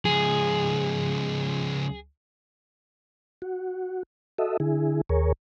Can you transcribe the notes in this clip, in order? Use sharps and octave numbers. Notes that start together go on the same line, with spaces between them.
C#2 F3 G#4
F#4
F#4 A4 D#5 E5
D3 E4 G#4
D#2 G#4 A#4 C#5